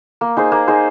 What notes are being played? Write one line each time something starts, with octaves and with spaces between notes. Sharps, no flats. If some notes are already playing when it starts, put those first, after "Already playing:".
A#3
D#4 G#4 C5
A#3
D#4 G#4 C5